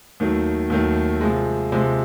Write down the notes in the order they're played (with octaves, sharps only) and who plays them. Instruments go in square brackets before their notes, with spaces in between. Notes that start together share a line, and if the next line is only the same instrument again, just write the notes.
[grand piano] D#2 D#3 F#3 A3
D#2 D#3 F#3 A3
C3 F3 G#3
C3 F3 G#3